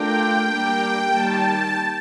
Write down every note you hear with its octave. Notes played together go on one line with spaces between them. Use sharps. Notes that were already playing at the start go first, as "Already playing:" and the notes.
Already playing: A3 D4 F4 A#4 G5
G3 A#3 D4 G4 A#4
D#3 G3 A#3 A5